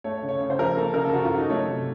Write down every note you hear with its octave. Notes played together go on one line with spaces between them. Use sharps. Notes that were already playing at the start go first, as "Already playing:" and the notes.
A3 C#5
C#5
C#3
C#5
C#3 C#5
C5
F3 A#4
A#3 A4
C#3 A#4
A4
C#3 F#4
F4
F#3
D#4
A3 C#5
C3